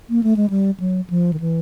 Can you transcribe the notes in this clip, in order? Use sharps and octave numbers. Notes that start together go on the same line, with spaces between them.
A#3
A3
G#3
G3
F#3
F3
D#3
E3